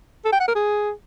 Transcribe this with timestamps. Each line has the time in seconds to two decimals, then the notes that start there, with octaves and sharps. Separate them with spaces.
0.25 A4
0.33 G5
0.40 F#5
0.48 A#4
0.55 G#4